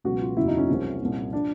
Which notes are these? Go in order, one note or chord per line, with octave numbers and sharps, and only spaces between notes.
C#2 B2 F#3 F#4
F4
F#1 E2 C#3 F#3 E4
D#4
C#4
C2 C3 F3
C2 A#2 F3
F3 D4